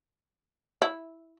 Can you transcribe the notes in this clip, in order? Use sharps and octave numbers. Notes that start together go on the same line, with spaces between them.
E4